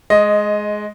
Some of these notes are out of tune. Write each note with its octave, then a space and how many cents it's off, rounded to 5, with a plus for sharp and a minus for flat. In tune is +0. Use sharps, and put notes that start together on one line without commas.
G#3 +15 D#5 +0